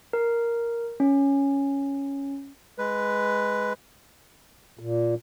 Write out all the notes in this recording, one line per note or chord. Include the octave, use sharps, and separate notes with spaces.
A#4
C#4
G#3 B4
A#2